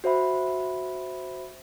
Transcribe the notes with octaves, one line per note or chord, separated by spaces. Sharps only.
F#4 C5 E5 B5